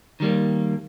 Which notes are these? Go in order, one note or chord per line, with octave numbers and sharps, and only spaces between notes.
D#3 G3 A#3